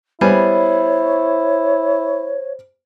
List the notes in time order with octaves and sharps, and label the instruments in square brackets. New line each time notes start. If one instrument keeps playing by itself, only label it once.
[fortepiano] G3 B3 G#5 [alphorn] E4 [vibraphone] C5 [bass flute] C#5